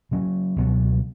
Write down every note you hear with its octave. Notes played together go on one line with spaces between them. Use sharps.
C#3 F#3 C#4
C#2 B2 F#3 B3